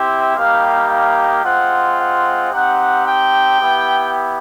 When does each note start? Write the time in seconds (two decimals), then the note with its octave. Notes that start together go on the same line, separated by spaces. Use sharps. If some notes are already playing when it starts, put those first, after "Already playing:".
Already playing: C4 E4 G4 E5
0.36 G3 A#3 D#4 G4 F5
0.89 F5
1.44 G#3 C4 F4 F#5
1.98 F#5
2.51 C4 D#4 G4 F#5
3.06 G5
3.59 B3 E4 G4